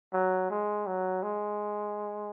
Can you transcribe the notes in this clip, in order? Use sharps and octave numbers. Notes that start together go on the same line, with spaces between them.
F#3
G#3
F#3
G#3